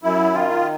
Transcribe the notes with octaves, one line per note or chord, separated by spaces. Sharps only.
F#2 E4
D#3 F4